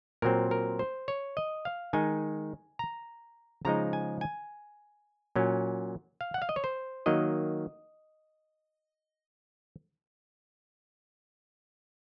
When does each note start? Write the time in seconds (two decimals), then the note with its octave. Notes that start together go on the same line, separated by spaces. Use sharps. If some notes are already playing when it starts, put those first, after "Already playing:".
0.22 A#2 F#3 C4 A#4
0.51 A#4
0.79 C5
1.08 C#5
1.37 D#5
1.65 F5
1.93 D#3 G#3 D#4 G#5
2.79 A#5
3.65 C#3 F3 G#3 D#4 A#5
3.93 G#5
4.21 G#5
5.36 A#2 F#3 C#4
6.21 F5
6.34 F#5
6.42 F5
6.49 D#5
6.56 C#5
6.64 C5
7.06 D#3 F#3 A#3 D#5